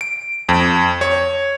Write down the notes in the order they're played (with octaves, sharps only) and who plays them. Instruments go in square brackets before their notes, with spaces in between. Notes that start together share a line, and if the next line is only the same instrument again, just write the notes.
[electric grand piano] D7
F2
C#5